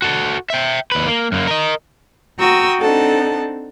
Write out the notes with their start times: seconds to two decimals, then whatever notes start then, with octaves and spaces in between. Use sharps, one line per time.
0.02 F#4 A4
0.50 E5 G5
0.92 D#2 B4
1.07 A#3
1.32 F#2 A#3
1.47 A#4 D#5
2.39 F#4 G5 A#5 C#6 D#6 E6
2.81 C4 D4 D#4 A4 F#5 A5